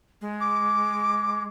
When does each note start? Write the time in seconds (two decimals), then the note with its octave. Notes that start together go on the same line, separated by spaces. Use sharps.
0.21 G#3
0.41 D6